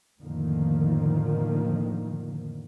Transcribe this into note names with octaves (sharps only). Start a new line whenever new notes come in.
F2 A2 D3 D#3 F3 A#3